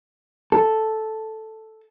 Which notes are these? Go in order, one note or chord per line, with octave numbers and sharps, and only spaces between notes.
A4